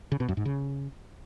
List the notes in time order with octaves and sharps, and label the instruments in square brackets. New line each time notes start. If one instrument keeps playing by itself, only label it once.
[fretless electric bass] C#3
B2
F#2
G#2
C#3